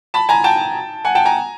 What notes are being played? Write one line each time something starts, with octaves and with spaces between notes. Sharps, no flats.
A5 B5
G#5 A#5
G5 A5
F#5 G#5
G5 A5
G#5 A#5